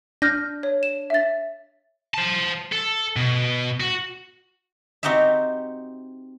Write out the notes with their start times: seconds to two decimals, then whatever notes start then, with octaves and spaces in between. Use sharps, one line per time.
0.22 D4 F6 G6 A#6
0.63 C#5
0.83 E7
1.10 E5 A6
2.14 C5 A5
2.72 A4
3.16 B2
3.80 F#4
5.03 C4 D#4 F#4 G4 E5